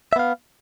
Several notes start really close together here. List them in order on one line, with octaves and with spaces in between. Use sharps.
E5 B3 F5